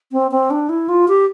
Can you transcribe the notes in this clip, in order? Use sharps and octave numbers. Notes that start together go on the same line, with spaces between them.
C4
C4
D4
E4
F4
G4